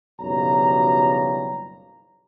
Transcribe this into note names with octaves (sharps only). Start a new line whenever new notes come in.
F#1 B1 F3 G3 C#5 A#5